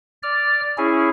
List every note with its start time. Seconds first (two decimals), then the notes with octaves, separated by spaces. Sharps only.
0.23 D5 F6
0.78 C#4 E4 G#4